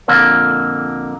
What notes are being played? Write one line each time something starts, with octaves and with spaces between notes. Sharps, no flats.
F2 A#2 D3 A#3